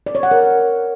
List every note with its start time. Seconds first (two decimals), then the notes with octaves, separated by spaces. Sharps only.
0.07 D5
0.15 C#5
0.23 F#5
0.31 A#4